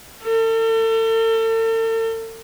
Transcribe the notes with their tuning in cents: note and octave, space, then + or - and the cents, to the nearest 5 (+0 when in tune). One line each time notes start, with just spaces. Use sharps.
A4 +40